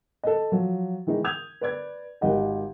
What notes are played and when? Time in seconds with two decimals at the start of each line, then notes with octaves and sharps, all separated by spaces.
0.23 A4 D#5
0.52 F3 F#3
1.07 D#3 E3 G#3 D#4
1.24 D#6 G6 G#6 F7
1.61 B4 D5 G#6
2.21 G#1 G4 D#5 F#5